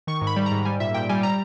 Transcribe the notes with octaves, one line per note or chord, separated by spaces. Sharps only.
D#3 C#6
G#2
B5
G3
A#5
G#2
G3 G#5
A#2 E5
A#2 G5
G3 G#5
G3 A#5